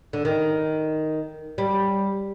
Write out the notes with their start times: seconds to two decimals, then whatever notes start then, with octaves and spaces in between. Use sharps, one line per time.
0.13 D3
0.25 D#3
1.58 G3